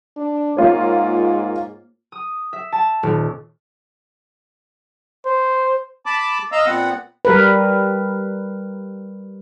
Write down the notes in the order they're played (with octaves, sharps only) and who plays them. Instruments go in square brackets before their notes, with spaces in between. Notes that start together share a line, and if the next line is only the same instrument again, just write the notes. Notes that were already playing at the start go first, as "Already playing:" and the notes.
[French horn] D4
[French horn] G#2 [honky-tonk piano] A#3 F4 C#5
[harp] D#6
E5
A5
D#1
[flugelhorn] C5
[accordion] A5 B5 D6
D#5 F5 A#5 E6
A#2 B3 C4 F#5
[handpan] G3 A#4 B4